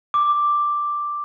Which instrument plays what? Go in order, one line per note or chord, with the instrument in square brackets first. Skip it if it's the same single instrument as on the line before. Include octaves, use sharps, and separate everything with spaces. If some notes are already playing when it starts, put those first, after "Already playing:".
[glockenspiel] D6